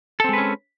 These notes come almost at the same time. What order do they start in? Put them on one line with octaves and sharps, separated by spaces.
A4 C4 G#3 B4 C#4